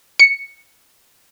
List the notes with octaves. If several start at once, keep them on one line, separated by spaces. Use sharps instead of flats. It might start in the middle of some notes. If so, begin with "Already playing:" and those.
C#7